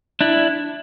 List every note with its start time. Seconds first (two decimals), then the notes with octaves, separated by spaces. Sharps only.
0.21 D4 E4